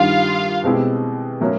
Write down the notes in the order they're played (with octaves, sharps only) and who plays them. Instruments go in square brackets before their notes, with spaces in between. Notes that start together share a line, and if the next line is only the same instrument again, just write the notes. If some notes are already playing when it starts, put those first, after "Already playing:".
Already playing: [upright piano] G2 D#3 G3 [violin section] F4 F5
[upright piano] B2 G#3 C4 E4 G4
A2 F#3 A#3 C#4